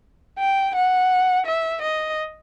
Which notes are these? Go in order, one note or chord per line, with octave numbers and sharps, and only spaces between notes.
G5
F#5
E5
D#5